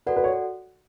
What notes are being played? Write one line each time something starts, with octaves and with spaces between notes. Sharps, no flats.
F#4 A4 B4 D5 F#5
B4
C#5